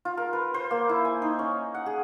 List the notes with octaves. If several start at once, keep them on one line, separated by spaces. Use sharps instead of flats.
F4
A#4
B4
C5
A#3
E4
G#5
D#4
C#4
F#5
G#4